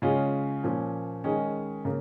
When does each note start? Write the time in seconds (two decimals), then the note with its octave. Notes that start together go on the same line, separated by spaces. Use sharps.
0.02 C#3 G#3 C#4 F4 G#4
0.64 A#2 F3 C#4
1.24 D#3 G#3 C#4 G#4
1.85 C#3 A#3